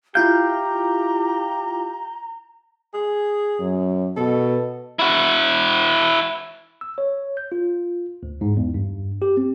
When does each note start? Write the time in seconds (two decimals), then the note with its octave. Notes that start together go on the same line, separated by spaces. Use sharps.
0.15 E4 F4 G4 F5 A#5 G6
2.94 G#4
3.60 F#2
4.17 B2 A4
4.99 E4 F#4
6.81 E6
6.98 C#5
7.37 G6
7.52 F4
8.23 D2
8.41 G#2
8.57 E2
8.74 G2
9.22 G4
9.37 C4